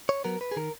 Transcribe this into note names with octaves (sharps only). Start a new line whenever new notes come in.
C#5
F#3 B3 A#4
B4
G#4
D#3 A#4